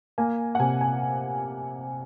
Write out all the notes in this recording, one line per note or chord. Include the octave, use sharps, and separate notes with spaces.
A#3 G#5
F#5
C3 G#5
G#5